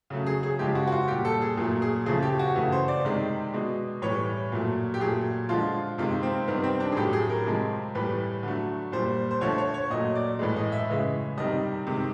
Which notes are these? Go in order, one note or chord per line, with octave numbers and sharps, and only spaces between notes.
C#3 F#3 A3
G#4
G#4
C#3 F3 G#3 G4
F#4
F#4
F4
A#2 G3 G4
A4
G#4
A#2 F#3 A3 G#4
G#4
C#3 F3 A3 G#4
G4
F#4
C#3 E3 A3 F#4
C5
D5
C3 D#3 G#3
B2 G#3
A2 E3 G3 C#5
A#2 F#3 A3
G4
A#2 F#3 A3 G#4
D3 F3 G#3 F4
C3 D#3 G#3 F4
C4
C3 D#3 G3 B3
C4
D4
G#4
A2 F#3 A3 G4
G#4
A#4
C3 F3 G#3
A2 E3 G3 B4
D3 F#3 A3
A#2 G3 C5
C5
D3 F3 A3 C#5
C#5
C#5
A#2 F#3 A3 D#5
D5
A2 E3 G#3
D#5
E5
C#3 E3 G#3
C3 D#3 G3 D#5
C3 D#3 G#3